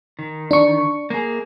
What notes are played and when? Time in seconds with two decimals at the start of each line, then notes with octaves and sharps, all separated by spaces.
0.19 D#3
0.51 D4 C#6
1.10 A#3 G#4